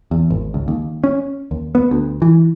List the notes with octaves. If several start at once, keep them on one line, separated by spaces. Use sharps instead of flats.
E2
G#1
C#2
D#2
C#4
D#2
B3
D2
E3